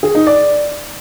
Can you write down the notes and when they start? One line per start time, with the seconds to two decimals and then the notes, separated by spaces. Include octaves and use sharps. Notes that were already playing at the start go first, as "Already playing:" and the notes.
0.03 G#4
0.15 D#4
0.27 D5